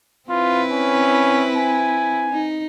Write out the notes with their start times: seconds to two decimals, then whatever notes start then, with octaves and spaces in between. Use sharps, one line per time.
0.29 C4 E4 F4 B4
0.72 C#4
1.56 G#5
2.30 D#4